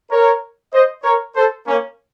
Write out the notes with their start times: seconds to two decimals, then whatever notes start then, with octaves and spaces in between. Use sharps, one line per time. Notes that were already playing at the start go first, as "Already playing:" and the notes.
0.11 A#4 C#5
0.73 C5 D#5
1.04 A#4 C#5
1.35 A4 C5
1.67 A#3 C#4